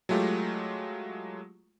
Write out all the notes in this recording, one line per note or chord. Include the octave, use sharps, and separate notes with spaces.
F#3 G#3 A3 F4 G4